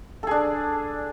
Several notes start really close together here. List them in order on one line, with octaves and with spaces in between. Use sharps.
A4 G#4 D4